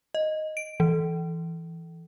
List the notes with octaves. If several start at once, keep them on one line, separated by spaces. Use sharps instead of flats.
D#5
D7
E3